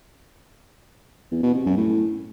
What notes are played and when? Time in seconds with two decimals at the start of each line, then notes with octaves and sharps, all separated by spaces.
1.32 E2
1.43 B2
1.55 C3
1.66 F#2
1.77 A2